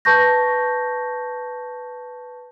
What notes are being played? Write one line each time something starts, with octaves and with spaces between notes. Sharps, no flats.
B4 A5 C#6 G6 A#6